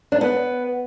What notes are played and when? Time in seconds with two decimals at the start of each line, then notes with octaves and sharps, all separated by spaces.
0.12 D4
0.21 B3